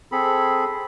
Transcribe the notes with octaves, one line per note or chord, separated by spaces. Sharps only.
C4 G#4 A4 B5